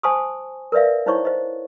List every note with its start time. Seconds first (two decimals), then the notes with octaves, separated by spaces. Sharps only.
0.03 C5 G#5 A5 C6 C#6 D#6
0.72 A#4 B4 D5 E5 F5
1.06 D#4 E4 C5 C#5 C#6
1.25 C5 D#5